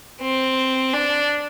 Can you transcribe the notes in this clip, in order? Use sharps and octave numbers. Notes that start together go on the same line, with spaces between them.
C4
D4